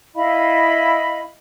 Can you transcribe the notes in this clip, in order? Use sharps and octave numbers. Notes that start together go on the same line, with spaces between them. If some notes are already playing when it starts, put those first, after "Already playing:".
E4 D#5 F5 B5